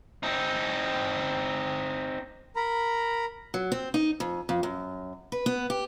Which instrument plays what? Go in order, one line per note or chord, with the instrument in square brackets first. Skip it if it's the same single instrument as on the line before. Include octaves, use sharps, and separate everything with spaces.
[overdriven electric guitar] C4 D#4
[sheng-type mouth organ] A#4 A#5 B5
[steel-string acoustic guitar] F#3
C4
D#4
F2
F2
F#2
B4
B3
G4